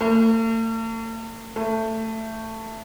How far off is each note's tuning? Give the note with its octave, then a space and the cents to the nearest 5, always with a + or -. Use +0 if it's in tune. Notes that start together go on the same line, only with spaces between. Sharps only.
A3 +45
A3 +15